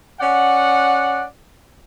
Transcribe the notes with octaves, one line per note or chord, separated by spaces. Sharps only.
C#4 D5 F#5